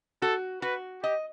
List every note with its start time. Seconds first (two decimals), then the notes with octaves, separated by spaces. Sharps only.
0.22 F#4 A4
0.62 F#4 B4
1.02 G4 D#5